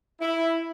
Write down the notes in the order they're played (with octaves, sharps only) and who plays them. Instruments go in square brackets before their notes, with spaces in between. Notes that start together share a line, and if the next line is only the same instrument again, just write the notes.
[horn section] E4